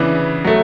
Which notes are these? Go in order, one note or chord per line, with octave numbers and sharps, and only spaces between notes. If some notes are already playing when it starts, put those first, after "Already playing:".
Already playing: C#3 E3 B3 D4
F#3 A3